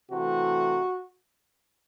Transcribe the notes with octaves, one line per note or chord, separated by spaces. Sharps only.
C3 E3 A3 F#4